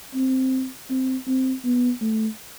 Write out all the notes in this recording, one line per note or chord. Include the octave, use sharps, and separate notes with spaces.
C4
C4
C4
B3
A3